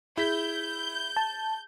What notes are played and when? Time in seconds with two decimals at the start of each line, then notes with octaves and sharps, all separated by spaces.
0.17 E4 G#4 G6 B6
1.16 A5